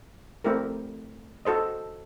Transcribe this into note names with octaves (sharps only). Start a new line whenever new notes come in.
A3 C4 E4 G4 A#4
F#4 A4 C5 D#5